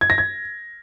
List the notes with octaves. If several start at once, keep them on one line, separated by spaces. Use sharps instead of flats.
G#6
A#6
G#6